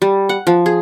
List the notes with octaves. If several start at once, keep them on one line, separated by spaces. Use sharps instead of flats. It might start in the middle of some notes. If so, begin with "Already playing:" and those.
G3
F#5
F3
G#4